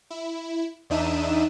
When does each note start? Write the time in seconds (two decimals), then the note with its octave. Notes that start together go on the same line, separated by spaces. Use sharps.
0.10 E4
0.90 E2 D4 D#4 E5 D#7 E7